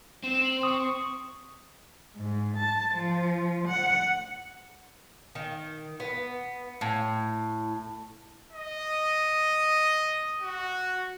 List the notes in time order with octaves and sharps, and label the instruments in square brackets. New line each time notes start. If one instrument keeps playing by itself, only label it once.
[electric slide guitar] C4 [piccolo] E7
[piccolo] F#7
[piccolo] C#6 [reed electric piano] D#6
[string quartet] G#2
A5
F3
F#5
[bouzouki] D#3
B3
A2
[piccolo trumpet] D#5
F#4